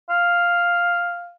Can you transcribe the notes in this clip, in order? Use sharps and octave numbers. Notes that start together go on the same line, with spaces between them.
F5